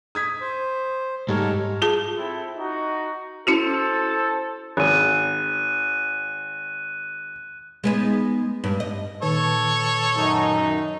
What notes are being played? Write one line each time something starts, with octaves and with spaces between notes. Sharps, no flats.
D#6 G#6 B6
C5
G#2 G3 A4 A#4 C#5
F4 G#4 A5
C4 E4 A4
D#4 F#4
C#4 E4 F#4 A4 C5
G#1 F#6 D#7
G#3 B3 D#4
G2
D#5
A#2 D#3 A4 B4 C#5
F#2 D#4